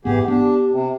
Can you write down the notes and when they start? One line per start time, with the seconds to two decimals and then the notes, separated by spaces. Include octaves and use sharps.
0.05 G#1 G#2 E3 B3 G4 G#4 F#5
0.28 B3 D4 G4
0.72 C3 C4